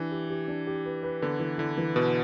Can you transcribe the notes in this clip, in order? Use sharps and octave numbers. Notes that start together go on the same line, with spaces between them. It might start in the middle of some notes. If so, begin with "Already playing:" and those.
Already playing: E3 D4 G4
G4
G4
D4
G4
B4
B4
D3 B3
E3
D3 E4
E3
B2 B3